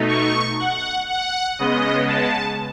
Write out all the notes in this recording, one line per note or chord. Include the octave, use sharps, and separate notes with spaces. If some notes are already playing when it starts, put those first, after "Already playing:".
Already playing: B2 A3 D#4
C#6
F#5
F#5
C#3 G#3 B3 D#5
A5